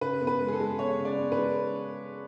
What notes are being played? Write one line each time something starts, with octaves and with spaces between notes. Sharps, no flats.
C#3 B4
B3
B4
G#3
G#4
A4
G#3
B3 C#5
C#3
D5
B3
B4
G#3